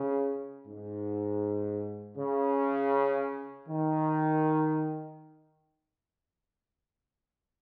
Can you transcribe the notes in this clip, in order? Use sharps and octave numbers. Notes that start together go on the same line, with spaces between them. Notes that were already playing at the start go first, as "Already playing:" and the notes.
Already playing: C#3
G#2
C#3
D#3